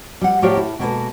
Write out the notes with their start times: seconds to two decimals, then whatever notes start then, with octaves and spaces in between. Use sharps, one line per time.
0.21 G3 F#5
0.42 A2 G4 A#4 C#5 D5 F5
0.57 E4 A4
0.79 B2 G#3 A#3 B3 A4 B4